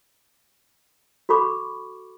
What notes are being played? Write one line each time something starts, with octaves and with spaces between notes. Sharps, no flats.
F#4 A4 B5 C#6 D6